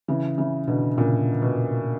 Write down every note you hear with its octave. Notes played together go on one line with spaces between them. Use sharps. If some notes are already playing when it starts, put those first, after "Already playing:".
C#3 E3
C#3 E3
B2 D3
A#2 C#3
B2